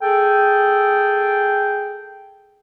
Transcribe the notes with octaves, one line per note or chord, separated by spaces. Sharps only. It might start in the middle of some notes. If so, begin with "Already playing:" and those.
G#4 A4 G5